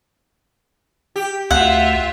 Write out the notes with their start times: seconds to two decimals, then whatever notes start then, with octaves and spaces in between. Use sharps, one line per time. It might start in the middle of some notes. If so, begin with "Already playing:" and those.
1.16 G4
1.51 D2 F4 E5 F#5